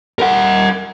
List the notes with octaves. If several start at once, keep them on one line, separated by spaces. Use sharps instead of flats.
A#4 F#5